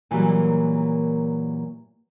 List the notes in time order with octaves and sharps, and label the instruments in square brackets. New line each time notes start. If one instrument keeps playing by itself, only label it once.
[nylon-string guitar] A#2 E3 F#3 G3 A#3